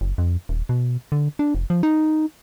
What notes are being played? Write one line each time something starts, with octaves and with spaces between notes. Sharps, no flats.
F#1
F2
D#1
B2
D3
D4
F1
F3
D#4